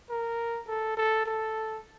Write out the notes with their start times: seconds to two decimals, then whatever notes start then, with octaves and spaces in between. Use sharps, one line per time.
0.10 A#4
0.67 A4
0.97 A4
1.26 A4